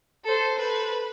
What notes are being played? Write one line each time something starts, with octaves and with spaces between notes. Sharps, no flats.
A4 C5
B4